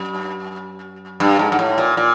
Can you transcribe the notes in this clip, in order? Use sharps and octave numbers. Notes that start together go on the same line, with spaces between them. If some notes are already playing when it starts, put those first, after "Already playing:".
Already playing: F#2
G2
G#2
G#2
A2
A#2
A#2